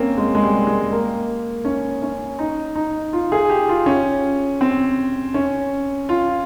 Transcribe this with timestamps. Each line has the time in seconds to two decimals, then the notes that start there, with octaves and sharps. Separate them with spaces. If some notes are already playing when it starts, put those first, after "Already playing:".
Already playing: A#3 C4 C#4
0.17 G#3
0.35 G#3
0.42 G3
0.67 G#3
0.92 A#3
1.65 C#4
2.02 C#4
2.39 D#4
2.76 D#4
3.13 F4
3.32 G#4
3.50 G4
3.69 F4
3.86 C#4
4.61 C4
5.34 C#4
6.09 F4